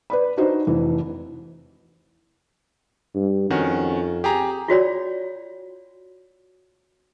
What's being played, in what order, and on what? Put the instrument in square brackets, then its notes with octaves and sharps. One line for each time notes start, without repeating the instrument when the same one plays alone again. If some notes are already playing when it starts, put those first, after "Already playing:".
[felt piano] B4 D5 B5
D4 D#4 F#4 C5
F1 E3
[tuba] G2
[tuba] F2 [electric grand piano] D#3 C#4 F#4
[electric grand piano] G4 G#4 A#5
[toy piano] F4 F#4 C#5 D5